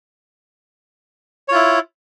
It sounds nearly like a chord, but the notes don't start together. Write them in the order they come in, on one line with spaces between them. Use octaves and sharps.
C#5 F4 E4